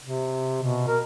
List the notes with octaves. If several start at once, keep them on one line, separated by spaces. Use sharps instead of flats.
C3
B2
A#4